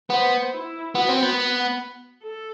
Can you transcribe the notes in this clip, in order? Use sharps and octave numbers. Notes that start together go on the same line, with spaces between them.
B3 C5
E4
B3 F#4
C4
B3
A4